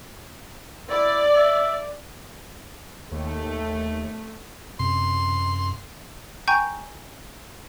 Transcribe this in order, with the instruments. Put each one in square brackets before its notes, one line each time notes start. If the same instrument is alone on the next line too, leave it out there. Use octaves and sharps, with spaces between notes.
[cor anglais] E4 [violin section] D5
[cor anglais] E5
[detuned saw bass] D#2 [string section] A3
[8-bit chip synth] F#2 [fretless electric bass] C3 [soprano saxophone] C6
[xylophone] G5 G#5 A#5 C#6 G6